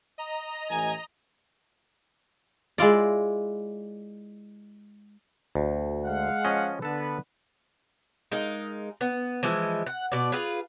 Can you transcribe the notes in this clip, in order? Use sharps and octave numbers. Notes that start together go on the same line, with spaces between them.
D#5 A#5
A1 G#5
G#3 E4 F4 D5
D2
G#3 F5 F#5
F3 C#4 D#5
D3 B3 A4 B4 A5
G#3 D#4 A#4 F5
B3
E3 F3 G#3 E4
F#5
B2 D5
F4 G#4 B4 F5